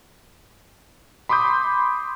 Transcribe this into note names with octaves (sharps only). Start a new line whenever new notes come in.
B5 C6 D6 D#6 G6